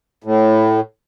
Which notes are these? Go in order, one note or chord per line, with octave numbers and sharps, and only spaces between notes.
A2